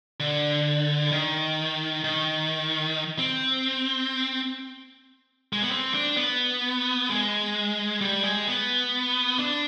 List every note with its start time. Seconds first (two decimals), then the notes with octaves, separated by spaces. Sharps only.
0.20 D3
1.12 D#3
2.04 D#3
3.19 C4
5.53 G#3
5.62 B3
5.71 C4
5.94 D4
6.17 B3
7.10 G#3
8.01 G3
8.24 G#3
8.47 B3
9.39 D4